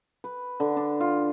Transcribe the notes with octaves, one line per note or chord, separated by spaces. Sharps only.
B4
D3
D4
F4